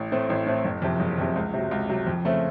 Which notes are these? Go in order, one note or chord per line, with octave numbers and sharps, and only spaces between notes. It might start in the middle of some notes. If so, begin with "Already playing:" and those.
Already playing: A1
A2 A3 C4
A1
A2 A3 C4
F#1
F2 C3
F#1
F2 C3
C#2
C3 F#3
C#2
C3 F#3
F2
C#3 A3 C4